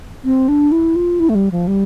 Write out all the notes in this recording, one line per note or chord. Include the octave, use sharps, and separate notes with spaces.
C4
D4
E4
F4
E4
A3
G3
F3
G3